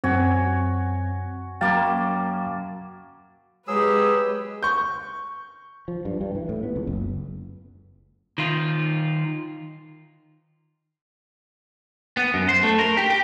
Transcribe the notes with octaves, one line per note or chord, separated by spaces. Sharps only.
F#2 C4 F#4 C#5 G#5
F#2 F#3 A#3 F5 G5 A5
F#3 G#3 G4 G#4 B4 E6
C#6 G6
F3
G2
G2
E3
A2
B3
C#2
F#1
D#3 F4
B3
F#2
C5
A3
A#4
G4
G4